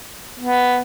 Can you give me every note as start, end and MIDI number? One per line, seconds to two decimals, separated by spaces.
0.40 0.80 59